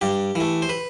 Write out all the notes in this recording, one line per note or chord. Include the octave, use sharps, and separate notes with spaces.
G2 G4
E3 A3
C5
B4